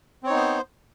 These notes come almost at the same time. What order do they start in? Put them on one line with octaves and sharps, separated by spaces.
C4 C#5 D#4 B3 C5